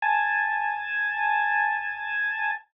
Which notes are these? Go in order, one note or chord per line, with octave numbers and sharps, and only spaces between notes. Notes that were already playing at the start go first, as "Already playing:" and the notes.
G#5 A5